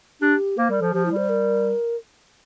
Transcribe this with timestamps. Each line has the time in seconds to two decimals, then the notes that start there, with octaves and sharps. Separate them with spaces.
0.21 D4 G4
0.57 A#3 C5
0.70 G3 A#4
0.81 F3 A4
0.93 F3 G4
1.05 E4
1.11 G3
1.16 C5
1.29 A#4